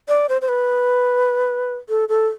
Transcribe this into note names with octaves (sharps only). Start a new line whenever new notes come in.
D5
C5
C5
B4
A4
A4